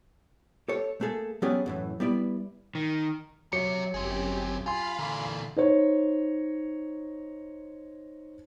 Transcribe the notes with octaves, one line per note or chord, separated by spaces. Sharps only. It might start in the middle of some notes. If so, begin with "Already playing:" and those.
G4 A4 C#5
A3 A#3 G#4 A4
F#3 B3 C#4 G4 G#4 D5
F#2 A2 E3
G3 B3 E4 D5
D#3
F#3 F#4 G4 C#5 E5 C#7
G1 F#2 C4 G4 G#4
F4 F5 G#5 B5 C6
A#2 D3 E3
D#4 C5 C#5